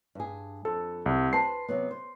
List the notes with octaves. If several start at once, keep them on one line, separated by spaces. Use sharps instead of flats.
G2 G#4
F2 A4
C2
B4 C5 A5 C7
C3 F#3 B3
C5